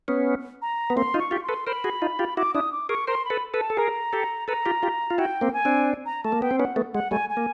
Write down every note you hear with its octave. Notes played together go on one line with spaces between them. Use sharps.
B3 C#4
A#5
B3
A#3 C4 C6
D#4 F4
C#6
F4 G4
C6
A4 B4
A#4 C5 B5
F#4 G#4
D#4 F4
F4 G4
E4 F#4 D6
D4 E4 D#6
D6
G#4 A#4 C#6
A#4 C5 C6
B5
A4 B4
A4 B4
A5
A4
G#4 A#4 A#5
G4 A4
A4 B4 A#5
F4 G4
F4 G4
F4
E4 F#4 G5
A#3 C4
G#5
C4 D4
A#5
A3 A5
A#3
B3 G5
C4
B3 C#4 F#5
A3 B3
G#3 F#5
G3 A3 G#5
G#5
A#3